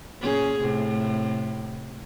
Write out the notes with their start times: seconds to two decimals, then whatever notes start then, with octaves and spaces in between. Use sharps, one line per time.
0.20 A#2 C#4 G#4
0.61 A2 C3